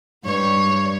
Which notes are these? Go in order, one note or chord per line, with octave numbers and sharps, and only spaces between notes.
G2 G3 C#5